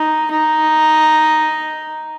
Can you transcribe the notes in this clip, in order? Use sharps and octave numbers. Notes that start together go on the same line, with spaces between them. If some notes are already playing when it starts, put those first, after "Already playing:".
Already playing: D#4
D#4